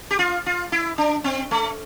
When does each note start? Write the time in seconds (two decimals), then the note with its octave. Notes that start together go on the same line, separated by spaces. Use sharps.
0.11 G4
0.19 F4
0.46 F4
0.72 E4
0.98 D4
1.24 C4
1.51 A3